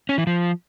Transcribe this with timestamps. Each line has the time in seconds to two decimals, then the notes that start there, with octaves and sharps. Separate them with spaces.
0.09 C#4
0.18 E3
0.27 F3